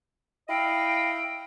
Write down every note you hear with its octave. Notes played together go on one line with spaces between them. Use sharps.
E4 D#5 F5 G5